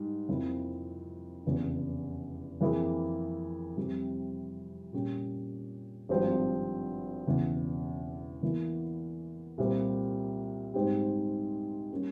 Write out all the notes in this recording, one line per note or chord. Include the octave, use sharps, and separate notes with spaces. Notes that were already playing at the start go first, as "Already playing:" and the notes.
Already playing: G#2 G3
F2 C3 F3 A#3 E4
F1 E2 C#3
F2 E3 A#3 E4 G#4
F2 C3 G3
A#2 G3 C#4 G4
G#1 G2 F3 C4 G4
E1 E2 C#3
E2 E3 A#3 E4
C2 A#2 G3 C4
G#2 G3 C4 G4
G3 A#3 C#4